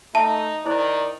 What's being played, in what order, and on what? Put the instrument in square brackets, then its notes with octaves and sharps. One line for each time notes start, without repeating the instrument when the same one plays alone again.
[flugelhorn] A3 [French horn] D#4 [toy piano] E5 [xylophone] A5
[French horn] D#3 [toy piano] E4 C5 [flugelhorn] D5